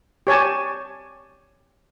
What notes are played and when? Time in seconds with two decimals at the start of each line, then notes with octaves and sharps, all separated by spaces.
0.27 G4 C#5 G#5 A5